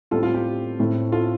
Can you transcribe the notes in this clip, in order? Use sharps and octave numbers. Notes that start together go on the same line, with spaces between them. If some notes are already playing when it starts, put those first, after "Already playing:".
A2 G3 C4 F4 A4
F4
G4
A2 A3 C4
F4 A4